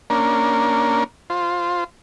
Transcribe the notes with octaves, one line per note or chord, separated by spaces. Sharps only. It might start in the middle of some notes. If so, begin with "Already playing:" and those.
A#3 C#4 D4 A#4
F4 C5